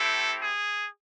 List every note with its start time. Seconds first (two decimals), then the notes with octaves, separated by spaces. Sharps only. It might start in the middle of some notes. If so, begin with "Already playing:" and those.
Already playing: A3 C4 E4 G4 A4
0.40 G#4